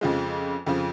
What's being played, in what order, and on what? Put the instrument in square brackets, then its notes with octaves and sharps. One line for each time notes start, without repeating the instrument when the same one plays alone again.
[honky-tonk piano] F2 C#3 F3 G#3
F2 C#3 F3